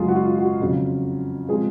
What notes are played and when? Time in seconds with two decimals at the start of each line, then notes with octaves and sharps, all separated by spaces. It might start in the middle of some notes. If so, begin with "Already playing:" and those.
Already playing: F#2 C#3 F#3 G#3 F4 G#4
0.08 F#4
0.16 F4
0.38 F#4
0.60 F2 C#3 F#3
1.49 C3 F3 G#3 G#4